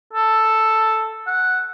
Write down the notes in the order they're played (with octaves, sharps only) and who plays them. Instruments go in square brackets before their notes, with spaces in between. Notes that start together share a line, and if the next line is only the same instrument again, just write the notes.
[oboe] A4
F#5